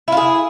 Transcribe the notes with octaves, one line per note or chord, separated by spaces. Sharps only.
E4 F4 G#4